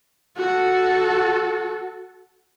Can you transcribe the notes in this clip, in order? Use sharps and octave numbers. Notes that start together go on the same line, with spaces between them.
F#4 A4